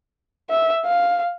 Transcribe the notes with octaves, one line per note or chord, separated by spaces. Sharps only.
E5
F5